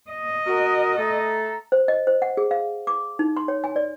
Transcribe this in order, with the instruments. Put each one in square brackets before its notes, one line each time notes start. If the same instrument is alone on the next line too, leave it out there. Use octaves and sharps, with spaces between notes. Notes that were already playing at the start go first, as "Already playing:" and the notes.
[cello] D#5
[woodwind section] F#4 A#4
A3 A4 A#5
[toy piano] C5
D#5
C5
F#5
G#4
F5
D6
D#4
C6
C#5
G#5
D5